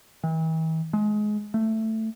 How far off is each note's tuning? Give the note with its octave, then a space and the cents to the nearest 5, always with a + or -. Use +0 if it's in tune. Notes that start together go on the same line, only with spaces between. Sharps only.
E3 -45
G#3 +20
A3 +10